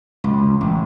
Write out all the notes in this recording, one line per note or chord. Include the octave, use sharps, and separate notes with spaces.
C#2
A1